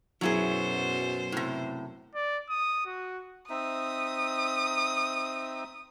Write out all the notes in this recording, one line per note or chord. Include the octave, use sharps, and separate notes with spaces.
F#2 B2 F#3 E4 G#4 C5
A2 C3
D5
D#6
F#4
C4 D#4 E5 D#6